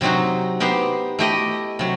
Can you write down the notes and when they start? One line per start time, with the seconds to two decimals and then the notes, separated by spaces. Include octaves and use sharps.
0.01 C3 F#3 C4 D#4 F#4
0.60 B3 D#4 G4 C5
1.19 A3 E4 G4 D#5
1.79 C3 F#3